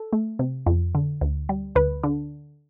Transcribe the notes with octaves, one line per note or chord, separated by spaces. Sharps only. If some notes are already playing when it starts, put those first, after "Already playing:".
Already playing: A4
A3
C3
F2
D3
D2
G3
D2 B4
D3